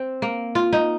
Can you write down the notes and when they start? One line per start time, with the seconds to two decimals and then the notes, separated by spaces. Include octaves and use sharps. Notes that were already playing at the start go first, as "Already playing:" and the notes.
Already playing: C4
0.22 A#3
0.55 F4
0.73 D#4